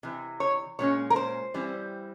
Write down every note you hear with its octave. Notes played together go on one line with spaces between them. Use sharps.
C3 E3
C#5
A#2 G#3 C#4 C#5
A#4
C5
E3 G3 C4